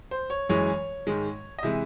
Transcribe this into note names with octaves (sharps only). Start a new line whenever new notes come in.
C5
C#5
F#2 E3 G#3 C#5
G#2 D#3 G#3
D#5
C3 E3 G#3 E5